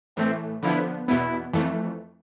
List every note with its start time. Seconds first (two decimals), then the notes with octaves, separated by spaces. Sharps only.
0.17 A2 E3 A3 C4
0.63 D3 F3 B3 E4
1.07 E2 B2 B3 E4
1.53 F2 E3 A3